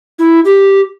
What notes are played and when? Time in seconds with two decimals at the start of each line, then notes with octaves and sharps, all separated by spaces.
0.19 E4
0.45 G4